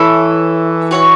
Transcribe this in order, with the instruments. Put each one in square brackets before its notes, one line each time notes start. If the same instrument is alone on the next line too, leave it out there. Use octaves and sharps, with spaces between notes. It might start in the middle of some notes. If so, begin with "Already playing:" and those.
Already playing: [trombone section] E3 [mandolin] E4 A4 C#5
[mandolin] F#4 C#5 F#5